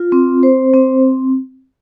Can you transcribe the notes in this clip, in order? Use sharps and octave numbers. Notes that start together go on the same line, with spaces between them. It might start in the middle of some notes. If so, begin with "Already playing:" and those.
Already playing: F4
C4
C5
C4